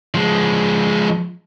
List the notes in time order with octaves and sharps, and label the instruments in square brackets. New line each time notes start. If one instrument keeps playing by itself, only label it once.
[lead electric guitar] F3 G#3